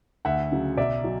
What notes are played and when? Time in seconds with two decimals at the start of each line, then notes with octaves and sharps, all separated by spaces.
0.25 D2 E5 F#5
0.52 C#3 F#3
0.77 B1 D5 E5
1.04 F#3